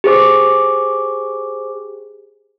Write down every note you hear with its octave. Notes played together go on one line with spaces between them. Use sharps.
G4 G#4 C5 D6